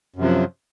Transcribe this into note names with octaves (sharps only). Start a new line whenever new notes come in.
F#2 C3 F3 F#3